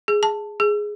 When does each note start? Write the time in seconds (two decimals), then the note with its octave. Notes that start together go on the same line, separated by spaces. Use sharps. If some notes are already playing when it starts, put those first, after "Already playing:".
0.08 G#4
0.23 A5
0.60 G#4